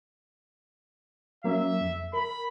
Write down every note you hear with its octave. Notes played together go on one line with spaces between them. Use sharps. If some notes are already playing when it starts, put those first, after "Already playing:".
F#3 A#3 C#4 E5
F2
A#4 B5